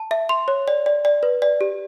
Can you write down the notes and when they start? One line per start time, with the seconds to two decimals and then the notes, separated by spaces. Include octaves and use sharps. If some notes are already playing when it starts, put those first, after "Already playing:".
Already playing: A5
0.11 E5
0.29 C6
0.48 C#5
0.68 D5
0.86 D5
1.05 D5
1.23 B4
1.42 D5
1.61 G4